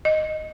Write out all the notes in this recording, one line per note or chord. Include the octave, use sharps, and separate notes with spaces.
D#5